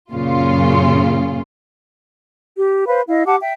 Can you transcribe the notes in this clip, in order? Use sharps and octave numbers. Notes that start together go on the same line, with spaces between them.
F#2 A#2 C#3 F4
G4
B4 C5 F5 B5
E4 D#5 F5
G4 F#5 A5 D6
E5 G5